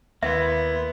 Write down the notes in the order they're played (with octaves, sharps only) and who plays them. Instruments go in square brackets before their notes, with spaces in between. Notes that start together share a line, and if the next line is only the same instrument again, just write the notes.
[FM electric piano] D#2 C6 [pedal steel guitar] A#3 E4 [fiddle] B3 [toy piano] E5 B5